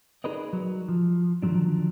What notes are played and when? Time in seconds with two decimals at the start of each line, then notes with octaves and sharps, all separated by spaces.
0.24 D#4 G#4 A#4 B4 D5 D#5
0.53 F#3
0.89 F3
1.42 D3 D#3 F3 F#3 D4